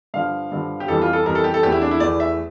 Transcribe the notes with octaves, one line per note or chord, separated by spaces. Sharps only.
G2 D3 F3 F5
G2 D3 F3
G4
F2 E3 G3 A4
F4
A4
F2 E3 G3 A#4
A4
G4
A4
E2 E3 A3 G4
E4
D4
E4
E2 E3 A3 D5
E5